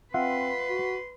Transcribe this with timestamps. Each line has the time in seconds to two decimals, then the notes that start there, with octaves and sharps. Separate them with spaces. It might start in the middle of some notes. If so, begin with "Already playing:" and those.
0.14 C4 F4 B4 E5 F#5 C6
0.70 F#4